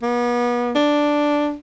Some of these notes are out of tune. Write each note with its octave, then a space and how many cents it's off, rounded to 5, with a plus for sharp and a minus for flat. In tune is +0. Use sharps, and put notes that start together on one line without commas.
B3 -35
D4 +0